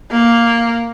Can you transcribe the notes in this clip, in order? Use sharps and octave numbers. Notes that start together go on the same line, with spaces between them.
A#3